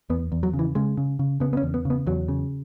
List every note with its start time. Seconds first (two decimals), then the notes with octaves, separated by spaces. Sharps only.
0.10 E2 B3
0.32 E2
0.43 F#3
0.54 C#3
0.59 E3
0.75 C#3 G#3
0.97 C#3
1.19 C#3
1.40 C#3 B3
1.53 B3
1.57 C#4
1.63 E2
1.74 B3
1.85 C#3
1.90 B3
2.07 E2 F#3
2.28 C#3